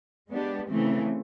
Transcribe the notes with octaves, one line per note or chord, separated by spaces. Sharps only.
G#3 B3 D4 G4
C#3 E3 A3 C4